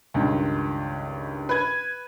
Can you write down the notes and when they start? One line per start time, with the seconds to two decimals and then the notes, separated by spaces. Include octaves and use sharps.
0.14 C#2 G2 D#3
1.49 B4 G#6